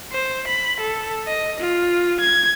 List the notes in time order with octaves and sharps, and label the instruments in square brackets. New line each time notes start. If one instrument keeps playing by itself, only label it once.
[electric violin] C5
B5
A4
D#5
F4
G#6